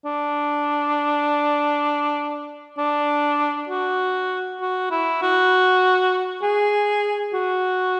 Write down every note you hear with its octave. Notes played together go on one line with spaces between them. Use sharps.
D4
D4
F#4
F#4
E4
F#4
G#4
F#4